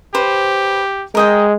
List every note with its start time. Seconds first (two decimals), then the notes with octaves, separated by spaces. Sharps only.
0.15 G4 B4 C5
1.15 G#3 A#4 D#5 G5